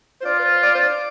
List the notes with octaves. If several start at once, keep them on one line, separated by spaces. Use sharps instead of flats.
C5
F4 D5
B4
C5
D5
C5
D5